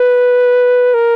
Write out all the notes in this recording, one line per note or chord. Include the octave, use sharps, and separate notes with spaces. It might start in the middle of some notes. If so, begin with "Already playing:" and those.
Already playing: B4
A#4